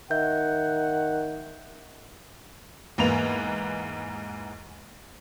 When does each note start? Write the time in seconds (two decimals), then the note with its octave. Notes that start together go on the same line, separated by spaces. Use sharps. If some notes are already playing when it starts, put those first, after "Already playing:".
0.11 D#3 E5 F#5 G6
2.98 E2 G#2 A#3 B4 F7